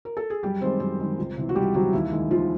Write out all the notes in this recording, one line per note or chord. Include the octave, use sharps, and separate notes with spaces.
A#4
A4
G#4
F#2 G3 G4
D#3 G#3 C4 C5
F#2 C4 C5
D#3 G#3
C#2
C3 E3
F#4
C#2 G3 G4
C3 E3 F#3 F#4
D#2 E3 E4
D#3 G#3
D#2 F3 F4